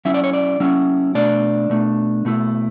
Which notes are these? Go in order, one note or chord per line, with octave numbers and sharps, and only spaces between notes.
F#3 C#4 E4 E5
D5
C#5
D5
F#3 C#4 E4
B2 A3 D4 D5
B2 A3 D4
B2 A3 E4